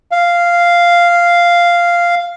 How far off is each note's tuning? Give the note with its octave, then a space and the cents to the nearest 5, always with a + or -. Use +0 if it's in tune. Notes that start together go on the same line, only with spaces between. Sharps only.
F5 -5